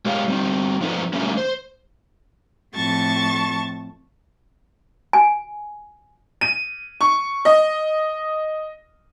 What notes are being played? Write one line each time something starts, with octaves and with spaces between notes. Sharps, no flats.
G#3 G4 A#4 C#5 F5
G3 C4 D#4
F3 A#3 C4 D#4 A4 B4
D3 E3 G3 A3 A#3 C#4
C5
F2 A2 A5 C#6 A6
G#5
D#7
C#6
D#5